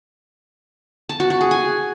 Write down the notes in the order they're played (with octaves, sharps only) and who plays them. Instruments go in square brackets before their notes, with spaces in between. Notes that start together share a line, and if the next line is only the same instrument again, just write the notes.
[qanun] A5
F#4
F#4
G#4
G#5